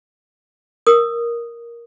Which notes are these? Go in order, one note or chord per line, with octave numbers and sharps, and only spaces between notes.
A#4 D#6